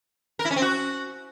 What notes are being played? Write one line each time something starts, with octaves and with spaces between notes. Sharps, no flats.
A#4
E4
C#4
C4
F#4